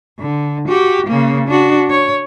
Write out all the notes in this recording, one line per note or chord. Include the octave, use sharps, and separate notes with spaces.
D3
F#4 G4
C#3 A#3
D4 F#4
C#5